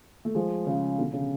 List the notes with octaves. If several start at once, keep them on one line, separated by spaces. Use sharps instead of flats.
A3
F3 G#3
C#3 F3
B2 D3
C#3